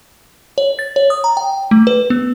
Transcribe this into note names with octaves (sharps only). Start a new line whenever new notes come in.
C#5
A6
C#5
D#6
A#5
G5
A3
B4
B3